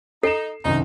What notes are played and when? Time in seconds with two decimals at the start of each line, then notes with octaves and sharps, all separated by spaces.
0.23 D#4 A4 C7 E7
0.65 C2 F#2 D#3 D#4